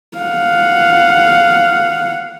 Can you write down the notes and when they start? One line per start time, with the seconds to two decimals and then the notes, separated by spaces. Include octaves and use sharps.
0.18 F5 F#5